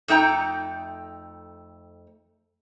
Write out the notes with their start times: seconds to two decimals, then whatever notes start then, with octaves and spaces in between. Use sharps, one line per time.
0.08 F2 A3 D#4 G5 A#5